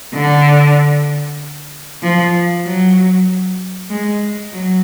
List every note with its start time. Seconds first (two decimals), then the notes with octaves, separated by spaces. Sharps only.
0.14 D3
2.03 F3
2.64 F#3
3.90 G#3
4.53 F#3